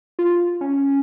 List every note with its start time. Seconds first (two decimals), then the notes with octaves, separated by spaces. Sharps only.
0.19 F4
0.61 C#4